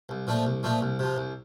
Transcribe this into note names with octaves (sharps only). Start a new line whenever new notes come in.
C2
A#2 F3 A3 D4
C2
A#2 F3 A3 D4
C2
C3 F3
C2